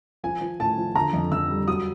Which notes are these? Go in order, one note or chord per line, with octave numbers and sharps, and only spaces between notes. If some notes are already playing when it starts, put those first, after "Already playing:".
F3 G#5
F3
A2 A5
F3
D3 A#5
F2
F2 E6
G3
F#3 D#6